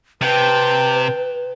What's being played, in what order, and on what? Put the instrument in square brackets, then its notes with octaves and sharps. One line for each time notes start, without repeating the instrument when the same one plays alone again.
[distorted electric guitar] C3 [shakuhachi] B4 [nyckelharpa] G5 A5